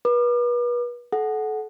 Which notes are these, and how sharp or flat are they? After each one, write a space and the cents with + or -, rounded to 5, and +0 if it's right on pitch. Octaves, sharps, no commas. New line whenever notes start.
B4 -35 D6 +40
A4 -30 F#5 +0